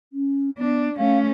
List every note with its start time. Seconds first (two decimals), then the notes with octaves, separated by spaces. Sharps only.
0.13 C#4
0.58 B3 D4
0.97 A3 C#4 F5